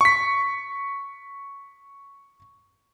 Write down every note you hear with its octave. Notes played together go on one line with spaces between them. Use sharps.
C#6 B6